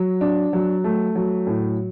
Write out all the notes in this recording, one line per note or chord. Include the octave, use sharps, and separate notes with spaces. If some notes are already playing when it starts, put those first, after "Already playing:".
Already playing: F#3
D4
F#3
A3
F#3
A2